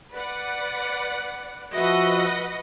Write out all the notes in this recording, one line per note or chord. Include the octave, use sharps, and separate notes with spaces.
B4 D5 F#5
F3 F#4 B4 D#5 E5 F#5